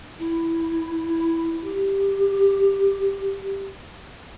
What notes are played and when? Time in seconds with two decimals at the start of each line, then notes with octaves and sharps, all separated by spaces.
0.19 E4
1.64 G4